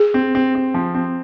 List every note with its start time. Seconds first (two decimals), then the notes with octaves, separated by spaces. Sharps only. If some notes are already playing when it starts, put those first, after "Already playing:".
Already playing: G#4
0.14 C4
0.35 C4
0.55 C4
0.74 F3
0.94 C4